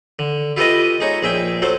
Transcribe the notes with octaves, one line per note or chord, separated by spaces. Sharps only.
D3
E4 F4 G4 A4 B4 D#5
G#3 D#4 C#5
A#1 G#4 E5 G5
F#3 A4 C5